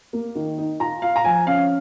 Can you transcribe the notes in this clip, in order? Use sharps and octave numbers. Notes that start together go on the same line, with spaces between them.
A#3
D#3
D#4
F4 A#5
F4 F5
A#5
F3 G#5
C#4 F5